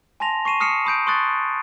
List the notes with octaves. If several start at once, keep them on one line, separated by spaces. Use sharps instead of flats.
G#5 A5 C6 A#6 F7
C#6 C7 D#7 E7
D#6 F6 C7 C#7 E7
B5 D#6 G6 D7
C6 C#6 D#6 F#6 A6